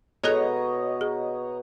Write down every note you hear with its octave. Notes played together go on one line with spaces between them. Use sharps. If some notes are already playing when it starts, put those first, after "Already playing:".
B2 G#4 A4 C#5 D#5 A#5
G#4